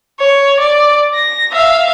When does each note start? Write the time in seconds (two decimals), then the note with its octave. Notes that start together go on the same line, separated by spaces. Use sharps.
0.20 C#5
0.60 D5
1.15 A#6
1.52 E5 F5